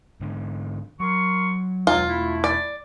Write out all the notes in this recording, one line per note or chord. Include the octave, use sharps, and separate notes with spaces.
G#2 D3
F#3 A#4 C6 C#6
E1 C#2 F#3 F4
A3 E4
D5